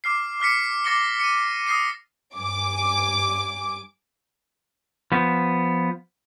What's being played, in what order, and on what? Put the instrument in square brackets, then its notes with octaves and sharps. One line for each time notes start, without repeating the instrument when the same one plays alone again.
[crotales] D6 F6 C7
D6 F6 B6 C#7
D6 A6 A#6 C#7 G7
C#7 D#7
D#6 F6 A#6 C7 D#7
[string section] G2 G#5 D6
[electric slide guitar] F3 B3